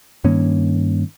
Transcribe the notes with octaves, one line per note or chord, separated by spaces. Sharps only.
G2 D#3 A#3 C#4